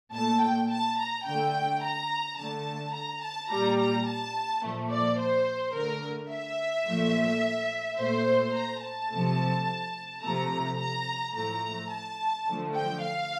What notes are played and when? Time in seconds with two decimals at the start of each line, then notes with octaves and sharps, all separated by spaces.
0.14 A#2 A3 A5
0.43 G5
0.70 A5
0.99 A#5
1.26 D3 A3 G5
1.83 A#5
2.38 D3 A3 A5
2.94 A#5
3.23 A5
3.50 A#2 G3 A#5
3.79 A#5
4.06 A5
4.63 A#2 F3 A3
4.90 D5
5.19 C5
5.74 D3 A3 A#4
6.30 E5
6.87 A#2 F3 A3
7.98 A#2 A3 C5
8.54 A#5
8.82 A5
9.11 C3 F3 A3
10.22 C3 F3 A3 A#5
10.79 A#5
11.34 A2 F3 A3 A#5
11.90 A5
12.46 D3 F3 A3
12.74 G5
13.02 F5